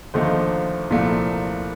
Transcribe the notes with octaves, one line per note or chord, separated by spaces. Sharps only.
D#2 D3 F3 A3 D#4 C5
C2 A#2 F3 A3